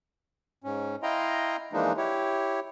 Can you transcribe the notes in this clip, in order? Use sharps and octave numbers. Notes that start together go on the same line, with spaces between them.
G#2 C#4
E4 D#5 F5 G5 A#5 C6
E3 F3 G#3 A#3 D4 D#4
E4 G4 C#5